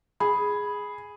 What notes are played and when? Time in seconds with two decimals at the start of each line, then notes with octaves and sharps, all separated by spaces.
0.20 G#4 B5